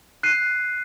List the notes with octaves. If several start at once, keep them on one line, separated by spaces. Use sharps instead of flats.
F#6 C7 D#7